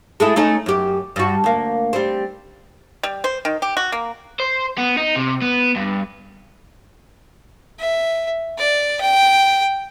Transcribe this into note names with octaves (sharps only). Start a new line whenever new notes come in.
G#3 A3 E4
A3 C#4 D#4
F#2 G4
G2 F#4
D2 A#3
G3 C4
G3
C5
D#3
G4
F#4
A#3
C5
B3
D#4
C3
B3
G2
E5
D5
G5